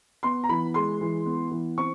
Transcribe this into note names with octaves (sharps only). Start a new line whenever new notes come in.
B3 C6
A#5
E3 B5
G#3 C6
E3
B3
E3
C4 C#6